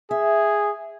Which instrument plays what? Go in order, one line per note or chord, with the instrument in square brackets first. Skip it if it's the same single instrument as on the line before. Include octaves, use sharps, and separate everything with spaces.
[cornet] G#4 [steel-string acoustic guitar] E5